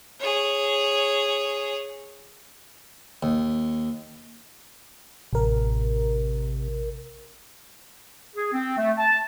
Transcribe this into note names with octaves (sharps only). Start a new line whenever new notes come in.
G#4 C#5
D#2
A1 C3 A#4
G#4
C4
A3
A5